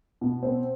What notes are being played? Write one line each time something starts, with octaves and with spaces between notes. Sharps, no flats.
B2
C4